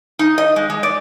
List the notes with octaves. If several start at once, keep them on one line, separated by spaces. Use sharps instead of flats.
D#4
D#5
G#3
G#3
D5